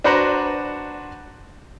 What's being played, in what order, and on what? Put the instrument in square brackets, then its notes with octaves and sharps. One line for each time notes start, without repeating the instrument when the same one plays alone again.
[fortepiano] D4 F#4 B4 C5 F#5 A#5